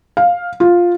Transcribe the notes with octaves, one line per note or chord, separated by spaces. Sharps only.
F5
F4